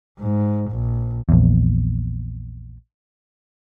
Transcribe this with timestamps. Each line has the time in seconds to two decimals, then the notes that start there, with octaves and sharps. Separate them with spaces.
0.19 G#2
0.71 A#1
1.29 A#1 E2